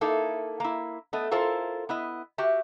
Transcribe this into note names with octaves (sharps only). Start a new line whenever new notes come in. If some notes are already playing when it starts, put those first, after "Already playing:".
A#3 D#4 E4 A4
A#3 E4
A3 B3 D#5
E4 F4 A4 A#4 C5
B3 E4 D#5
F#4 G4 E5